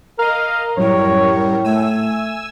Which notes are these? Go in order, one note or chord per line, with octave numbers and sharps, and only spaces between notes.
A#4 D#5 F5
F#2 A2 G3 A#4 C#5
A3 G#5 E6